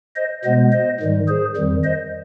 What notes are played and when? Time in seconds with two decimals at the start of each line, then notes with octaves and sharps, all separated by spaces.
0.16 C5 D#5
0.44 B2 G#3 B3 C5 D#5
0.72 C5 D#5
1.00 G#2 D#3 G3
1.28 G#4 C5
1.56 F2 D#3 G3
1.84 C5 D#5